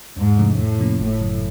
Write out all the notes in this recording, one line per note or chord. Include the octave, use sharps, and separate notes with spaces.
E2 G#2
C3 F3 A3 D4
F2 A2
C3 F3 A#3 C#4
G1 A2
F#2 C#3 F#3